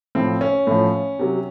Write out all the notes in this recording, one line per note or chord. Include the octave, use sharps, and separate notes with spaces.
A2 F3 C4
C#4
A2 F3
C3 F#3